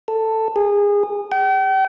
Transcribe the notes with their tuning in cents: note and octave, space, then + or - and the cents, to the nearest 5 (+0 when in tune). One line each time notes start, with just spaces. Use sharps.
A4 +10
G#4 -25
G5 -40